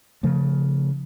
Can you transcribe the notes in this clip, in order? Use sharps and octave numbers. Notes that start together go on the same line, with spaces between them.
C#3 F3 A3